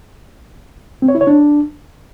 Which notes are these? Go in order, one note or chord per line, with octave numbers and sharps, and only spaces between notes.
C4
C#5
E4
C#5
D4